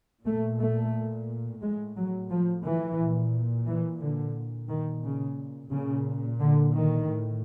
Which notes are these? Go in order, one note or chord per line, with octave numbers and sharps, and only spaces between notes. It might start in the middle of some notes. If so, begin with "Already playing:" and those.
A#2 A3
A3
A2 G#3
F#3
F3
E3
A#2
E3
D3
A#2
D#3
C#3
A#2 C#3
D3
D#3
A2